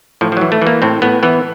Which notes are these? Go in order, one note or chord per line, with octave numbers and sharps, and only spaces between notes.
A2 F3
F3
E3 F#3
A3
E3
A#3
A2 C4
A2 B3
E3 B3